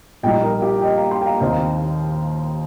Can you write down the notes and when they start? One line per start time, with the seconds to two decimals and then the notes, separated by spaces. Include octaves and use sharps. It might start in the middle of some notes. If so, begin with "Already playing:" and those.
0.23 A#1 A#2 G3 D#4 D#5 G5
0.42 A#4 D#5
0.62 G4
0.81 D#5 G5
0.96 F5 A#5
1.11 G5 C6
1.22 G5
1.26 F5 A#5
1.41 D#2 D#3 C4 D#4 C5 F5